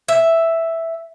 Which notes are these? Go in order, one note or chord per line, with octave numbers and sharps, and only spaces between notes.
E5